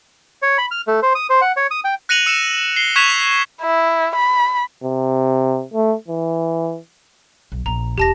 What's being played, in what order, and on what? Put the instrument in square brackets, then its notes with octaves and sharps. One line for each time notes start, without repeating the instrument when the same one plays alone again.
[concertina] C#5
B5
F6
A3
C5
D#6
C5
F#5
C#5
D#6
G5
[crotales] F#6 A#6 C#7 D#7 F7 F#7
E6 C#7 D#7 E7
C7 G7
C#6 F#6 G#6 B6 E7 F7
[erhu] E4
B5
[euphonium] C3
A3
E3
[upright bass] B1
[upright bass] A#1 [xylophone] A#5
[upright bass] E1 [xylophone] G4 A5 A#6